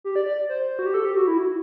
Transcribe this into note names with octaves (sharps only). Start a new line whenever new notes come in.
G4
D5
D5
C5
F#4
G4
A4
G4
F#4
E4
F#4